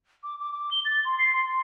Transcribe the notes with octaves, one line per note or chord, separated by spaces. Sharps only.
D6
D6
D6
G7
A6
C6
C7
C6
C6